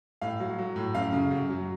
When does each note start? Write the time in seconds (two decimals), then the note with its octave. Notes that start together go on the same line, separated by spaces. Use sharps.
0.22 A2 F5
0.40 F#3
0.58 F#3
0.76 A2
0.94 F#2 F5
1.13 C#3
1.31 F#2
1.49 F#3